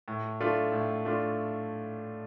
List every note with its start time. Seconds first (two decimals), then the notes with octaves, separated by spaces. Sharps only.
0.08 A2
0.41 A3 D4 F4
0.72 A2
1.05 A3 D4 F4